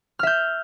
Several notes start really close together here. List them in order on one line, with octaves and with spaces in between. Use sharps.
F6 E5 G6